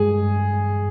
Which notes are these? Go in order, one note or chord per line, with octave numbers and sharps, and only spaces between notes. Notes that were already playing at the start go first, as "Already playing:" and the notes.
Already playing: G2 G#3 G#4
G2
G#3